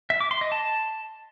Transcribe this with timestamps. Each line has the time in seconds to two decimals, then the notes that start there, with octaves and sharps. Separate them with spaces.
0.10 E5
0.21 D6
0.31 C6
0.41 D#5
0.52 A5